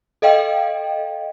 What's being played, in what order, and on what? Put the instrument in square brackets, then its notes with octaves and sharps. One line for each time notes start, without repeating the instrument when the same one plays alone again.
[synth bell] A4 D#5 F5 G5